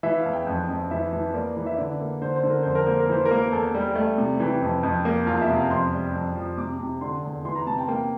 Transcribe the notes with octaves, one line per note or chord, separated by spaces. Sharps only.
E3 E5
F5
E2
G5
F2
F2
E3 E5
E3
A#3 D5
E3
E5
D3 D5
A#3
D3 C5
C5
D3
A#4
F2 C5
A#4
A#3 C5
A#4
E3 C5
A#4
A#3
E2 A4
G3
A3
C3
E3 G4
F2
F2
A#3
E2 F4
E5
C3
F5
F2 C6
G3
F2
F3
C3 D6
C3
D3 C6
E2
E3 C6
A#5
C3 A5
G5
A#3 G5